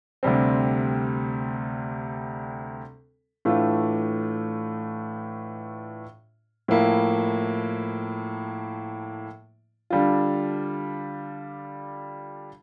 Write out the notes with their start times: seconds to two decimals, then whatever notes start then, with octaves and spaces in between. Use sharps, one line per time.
0.23 D2 C3 G3 C4
3.45 A2 E3 A3 D4 F4
6.68 A2 F3 A#3 E4
9.90 D3 G3 D4 F4